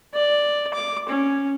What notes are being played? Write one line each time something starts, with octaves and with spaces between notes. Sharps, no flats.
D5
D6
C#4